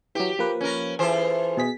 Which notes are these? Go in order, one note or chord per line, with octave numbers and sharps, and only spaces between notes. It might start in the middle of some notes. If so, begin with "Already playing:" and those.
E3 F#3 G4
F3 A#3 B4
C#4 A#4
E3 F4 G#4 A4 C5
B2 G#4 B6